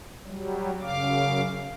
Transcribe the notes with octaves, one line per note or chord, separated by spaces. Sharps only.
F#3 G3
F#2 C#3 F5 D6